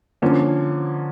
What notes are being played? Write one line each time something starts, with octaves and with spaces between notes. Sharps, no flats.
D3 F3 A#3 C#4